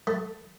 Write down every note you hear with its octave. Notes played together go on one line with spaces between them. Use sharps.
A3